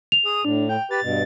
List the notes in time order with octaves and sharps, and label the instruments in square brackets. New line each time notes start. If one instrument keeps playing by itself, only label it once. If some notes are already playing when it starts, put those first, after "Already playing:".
[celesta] F7
[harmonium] G#4 [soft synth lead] D#6
[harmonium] A2 [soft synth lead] D4
[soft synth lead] G5
[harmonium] G4 B4 [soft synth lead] A6
[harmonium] G2 B2